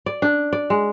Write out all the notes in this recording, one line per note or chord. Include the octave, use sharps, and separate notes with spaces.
D5
D4
D5
G#3